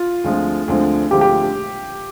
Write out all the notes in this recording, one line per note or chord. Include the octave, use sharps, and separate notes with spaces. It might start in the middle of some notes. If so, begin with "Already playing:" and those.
Already playing: F4
D2 D3 F3 G#3 C4
D2 D3 F3 G#3 C4
D2 D3 F3 G#3 C4 G4
G4